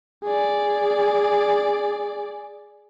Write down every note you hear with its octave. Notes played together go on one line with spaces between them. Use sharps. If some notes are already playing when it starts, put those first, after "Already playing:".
G#4 D5